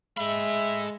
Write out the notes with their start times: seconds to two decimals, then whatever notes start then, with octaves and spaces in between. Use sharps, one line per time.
0.18 G#3 A4 E5 B5